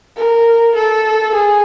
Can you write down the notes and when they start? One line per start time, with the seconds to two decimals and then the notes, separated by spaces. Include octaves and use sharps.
0.17 A#4
0.76 A4
1.35 G#4